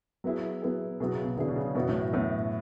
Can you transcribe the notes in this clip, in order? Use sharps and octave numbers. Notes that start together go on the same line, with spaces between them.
F#3 B3 E4 G#4
F#3 B3 E4 G#4
B2 F#3 B3 E4 G#4
C#3
B2
D3 F#3 B3 E4 G#4
B2
C#3
F#2 B2 E3 B3 F#4
A2
F#2 A2 E3 B3 F#4